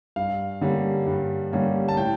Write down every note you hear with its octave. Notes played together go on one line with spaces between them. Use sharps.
G2 F5
D3 G3 A#3 C#4
G2
D3 G3 A#3 C#4
A5
A2 G5